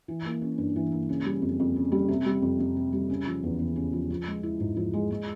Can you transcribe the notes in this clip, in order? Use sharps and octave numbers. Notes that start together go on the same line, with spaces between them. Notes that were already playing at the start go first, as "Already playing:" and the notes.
E3
A#3
C#4
G2
E3
A#3
C#3
G3
F2
F2
C#3
G3
C3
G3
F2
F2
C3
G3
C#3
F3
E2
E2
C#3
F3
F3
G#3
E4
G#2
F3
G#3
G#3